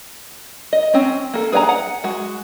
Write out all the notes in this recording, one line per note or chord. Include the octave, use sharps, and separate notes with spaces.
D#5
C4 C#4
A#3 A4
G#4 B4 E5 G#5 A#5
F#5
G#3 F#4